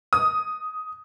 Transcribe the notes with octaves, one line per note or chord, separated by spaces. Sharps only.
D#6